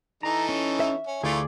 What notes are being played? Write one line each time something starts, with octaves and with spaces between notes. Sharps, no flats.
E3 D#4 A4 A#5
C#4
E5
C#4
D2 E3 A3 F4 G#4 D5